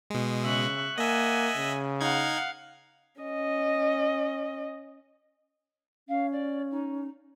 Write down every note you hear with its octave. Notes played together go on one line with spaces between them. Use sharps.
B2 G#3
C#3 E5 C#6 F#6
A#3 D#5 E5 F#5 G#5
C#3
D#4 F5 F#5 G#6
C#4 D#5
C#4 F5
D5
D#4